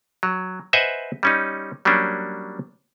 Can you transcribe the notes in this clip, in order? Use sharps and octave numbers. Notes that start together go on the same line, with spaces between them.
F#3
B4 C5 D#5 E5 F#5 G#5
G3 C#4 D#4
F#3 G3 A#3 C#4 D4